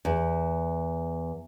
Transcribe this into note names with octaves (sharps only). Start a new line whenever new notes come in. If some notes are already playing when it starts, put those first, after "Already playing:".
E2